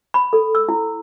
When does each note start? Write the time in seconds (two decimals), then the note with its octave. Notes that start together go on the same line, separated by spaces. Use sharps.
0.14 B5
0.33 A4
0.55 E6
0.69 E4